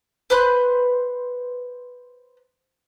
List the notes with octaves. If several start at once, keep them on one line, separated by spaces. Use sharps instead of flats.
B4 C5 B5 F#6